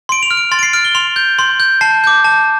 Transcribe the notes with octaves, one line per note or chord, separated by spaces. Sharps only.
C6 D7
F7
F6
D7
C6 A6
D7
C7
F6 D7
G7
C6 F7
G6
C6
G6
A5 C7
D6 G6
A5